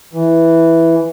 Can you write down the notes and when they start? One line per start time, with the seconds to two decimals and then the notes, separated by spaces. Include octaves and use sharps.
0.13 E3